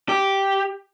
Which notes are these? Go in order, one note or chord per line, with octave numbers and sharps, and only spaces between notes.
G4